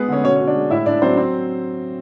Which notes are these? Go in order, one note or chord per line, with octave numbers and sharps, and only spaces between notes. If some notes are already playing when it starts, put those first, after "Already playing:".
Already playing: G#3 B3 G#4 B4
D3 C#4 C#5
B2 C#4 C#5
B2 C#5
D4 D5
G#3
A2 E4 E5
A2 D4 D5
F#3 C4 C5
C4